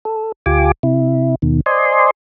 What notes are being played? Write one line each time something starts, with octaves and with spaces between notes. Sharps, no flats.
A4
D2 F4 G4 G#5 D6
C3 E4
D#2 B2 D#3
C5 D5 D#5 G#5 C6